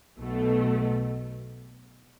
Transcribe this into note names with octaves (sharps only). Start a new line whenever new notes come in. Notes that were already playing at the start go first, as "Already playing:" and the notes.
B1 B2 A3